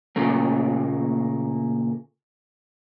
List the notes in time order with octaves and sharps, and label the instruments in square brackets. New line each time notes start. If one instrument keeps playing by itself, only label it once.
[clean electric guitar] A#2 C#3 A3 A#3